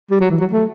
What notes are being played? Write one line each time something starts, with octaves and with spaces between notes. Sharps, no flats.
G3
F#3
E3
F#3
A3